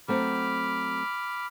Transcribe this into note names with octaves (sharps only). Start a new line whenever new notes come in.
F#3 A3 C4 B5 D6 F6